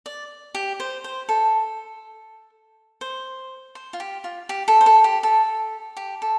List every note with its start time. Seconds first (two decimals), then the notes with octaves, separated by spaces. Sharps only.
0.06 D5
0.54 G4
0.80 C5
1.04 C5
1.29 A4
3.01 C5
3.75 C5
3.93 F4
4.00 G4
4.24 F4
4.49 G4
4.68 A4
4.81 C5
4.86 A4
5.04 G4
5.23 A4
5.97 G4
6.22 A4